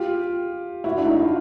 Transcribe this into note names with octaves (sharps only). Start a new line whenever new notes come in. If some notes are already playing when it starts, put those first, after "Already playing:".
Already playing: F4 G4
E4 F#4
D4
D#4
E4
F4